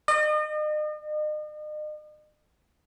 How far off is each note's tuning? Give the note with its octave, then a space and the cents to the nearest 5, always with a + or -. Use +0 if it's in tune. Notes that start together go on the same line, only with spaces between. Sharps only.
D#5 -40